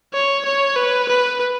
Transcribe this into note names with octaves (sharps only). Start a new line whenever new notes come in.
C#5
C#5
B4
B4